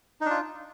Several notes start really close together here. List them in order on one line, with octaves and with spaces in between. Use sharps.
D#4 D4 F4